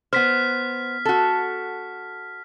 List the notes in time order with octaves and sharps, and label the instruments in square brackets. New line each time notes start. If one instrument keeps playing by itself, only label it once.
[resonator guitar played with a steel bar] B3 C5 [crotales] F6 B6
[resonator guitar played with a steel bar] F#4 A4